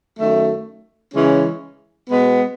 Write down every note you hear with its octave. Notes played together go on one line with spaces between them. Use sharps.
F#2 D#3 A3
C#3 E3 G#3 C#4
B2 G#3 B3